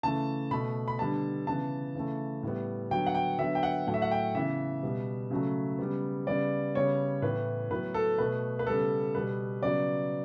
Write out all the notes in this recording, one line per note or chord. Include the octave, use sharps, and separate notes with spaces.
C#3 E3 A3 A5
B2 A3 B5
B5
D3 G3 B3 A5
C#3 E3 B3 A5
C#3 E3 A3
A2 G3 B3
D3 F#3 B3 G5
F#5
G5
D3 F#3 B3 E5
G5
F#5
A2 F#3 A3 F#5
E5
F#5
G5
C#3 E3 B3 E5
B2 G3 B3
C#3 F#3 A3
C#3 G3 B3
C#3 G3 B3 D5
C#3 G3 B3 C#5
A2 E3 B3 B4
A2 F#3 B3 B4
A4
B2 A3 B4
B4
C#3 G3 B3 A4
B2 G3 B3 B4
C#3 F#3 B3 D5